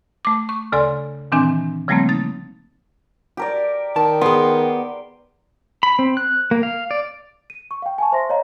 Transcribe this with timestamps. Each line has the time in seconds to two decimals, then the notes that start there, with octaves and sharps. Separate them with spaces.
0.25 A3 D6
0.49 C#6
0.72 D2 C#3 A4 D5 G#5 C6
1.32 A#2 D#3 E3 C4 D4 G#5
1.88 C#3 F3 G3 A3 A#3 C4
2.09 D#4 A6
3.37 G4 A#4 D5
3.96 D#3 A5
4.21 B3 G#4 C6
5.83 B5
5.99 C4
6.17 F#6
6.51 A#3
6.63 F5
6.91 D5
7.50 D#7
7.71 C#6
7.82 F5 G5
7.98 G#5 A5 C#6
8.12 C5 E5 C6 A#6
8.29 C#5 D#5 F5 A#5